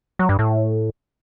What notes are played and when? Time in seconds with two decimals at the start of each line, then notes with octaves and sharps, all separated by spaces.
0.19 F#3
0.29 G2
0.39 A2